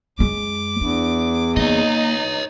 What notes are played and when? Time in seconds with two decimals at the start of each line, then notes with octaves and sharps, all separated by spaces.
0.19 F#2 G#3 D6
0.81 E2 D4
1.57 A#3 D#4 C#5 D#5